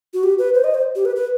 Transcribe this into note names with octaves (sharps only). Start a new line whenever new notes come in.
F#4
G4
B4
C5
D#5
C5
G4
B4
B4